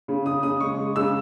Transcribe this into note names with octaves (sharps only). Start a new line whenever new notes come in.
C#3
C#3 D#6
C#3 D#6
G#3 C#6
G#3
C#3 E6